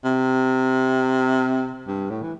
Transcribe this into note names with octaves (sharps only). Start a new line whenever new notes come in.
C3
G2
A2
E3